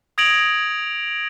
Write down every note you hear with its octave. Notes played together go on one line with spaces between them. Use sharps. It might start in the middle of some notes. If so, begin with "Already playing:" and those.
D#6 G#6 A#6 D7 F7 F#7